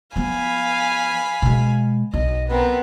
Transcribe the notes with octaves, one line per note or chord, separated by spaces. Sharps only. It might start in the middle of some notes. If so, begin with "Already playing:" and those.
F3 B3 F5 G#5 B5
B2 G#3
B1 D#5
B3 C4 A#4